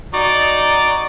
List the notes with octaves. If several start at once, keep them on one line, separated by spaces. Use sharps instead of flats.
D#4 F#4 D5